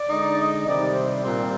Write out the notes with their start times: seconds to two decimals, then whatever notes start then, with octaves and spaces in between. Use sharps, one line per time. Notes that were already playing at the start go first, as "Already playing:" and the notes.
Already playing: D5
0.09 D3 G#3 D#4
0.37 D#5
0.66 C3 D#3 G3 D5
0.94 C5
1.23 A#2 G3 C4